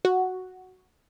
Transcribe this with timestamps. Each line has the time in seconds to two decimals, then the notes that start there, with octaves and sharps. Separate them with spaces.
0.05 F#4